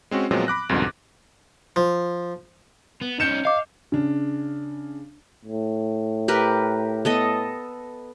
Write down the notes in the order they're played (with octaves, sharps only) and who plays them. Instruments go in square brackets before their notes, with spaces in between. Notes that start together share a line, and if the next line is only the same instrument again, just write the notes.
[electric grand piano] G#3 C4 C#4 F#4
A#2 F3 F#3 G#3 B3 C4
B5 D6 F#6 A#6
C2 F2 G#2 B2 D3
[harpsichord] F3
[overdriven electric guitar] B3
[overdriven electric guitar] C#4 D#4 [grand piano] G6 C#7 E7
[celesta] D#5 D6 [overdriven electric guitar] F5
[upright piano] C#3 D4
[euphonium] A2
[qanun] G4 A#4 B4
B3 A4 D#5